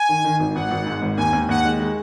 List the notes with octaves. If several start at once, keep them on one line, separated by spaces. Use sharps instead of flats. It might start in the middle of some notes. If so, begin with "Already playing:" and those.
Already playing: G#5
D#3
D#3
G#1
G#1 F#5
G#1
G#2
G#1
D#2 G#5
D#2
D#2 F#5
G#3
G#3